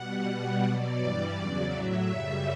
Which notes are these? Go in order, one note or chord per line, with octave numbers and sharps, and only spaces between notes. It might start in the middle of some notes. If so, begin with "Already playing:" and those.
Already playing: B2 G3 F#5
B2 G3
B2 F#3 D5
G2 E3 G3
E2 C#3 F#3
A2 F#3 E5
F#2 C#3 G3